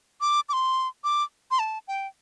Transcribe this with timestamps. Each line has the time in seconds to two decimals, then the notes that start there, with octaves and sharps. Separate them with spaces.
0.21 D6
0.49 D6
0.53 C6
1.04 D6
1.51 C6
1.59 A5
1.88 G5